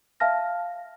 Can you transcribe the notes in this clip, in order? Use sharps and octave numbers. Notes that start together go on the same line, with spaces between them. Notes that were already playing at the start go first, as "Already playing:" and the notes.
E5 F5 A5 F6 A#6